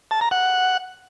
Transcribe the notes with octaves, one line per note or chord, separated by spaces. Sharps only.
A5
A#5
F#5